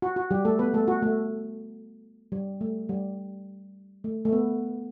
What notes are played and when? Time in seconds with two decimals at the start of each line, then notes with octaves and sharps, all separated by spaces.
0.02 F#4
0.16 F#4
0.31 G3 G4
0.45 A3 A4
0.59 B3 B4
0.74 A3 A4
0.88 F#4
1.02 A3
2.32 G3
2.61 A3
2.89 G3
4.04 A3
4.25 A3
4.32 B3